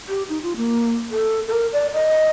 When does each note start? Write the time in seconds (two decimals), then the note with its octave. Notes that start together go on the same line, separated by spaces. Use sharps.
0.09 G4
0.29 D#4
0.43 F4
0.56 A#3
1.11 A4
1.48 A4
1.53 A#4
1.73 D5
1.93 D#5